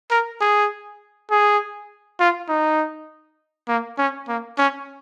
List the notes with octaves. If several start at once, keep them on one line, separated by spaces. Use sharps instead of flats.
A#4
G#4
G#4
F4
D#4
A#3
C#4
A#3
C#4